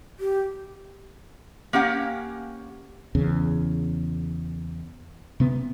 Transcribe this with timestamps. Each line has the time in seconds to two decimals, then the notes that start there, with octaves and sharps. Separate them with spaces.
0.20 G4
1.73 A#3 C#4 G4 F5 F#5
3.15 E2 C#3
5.40 C3 B3